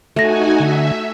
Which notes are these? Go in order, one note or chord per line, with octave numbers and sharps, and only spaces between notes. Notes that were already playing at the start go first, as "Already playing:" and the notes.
A3 D#4 F#4 A4 G#5 A#6
D3 E5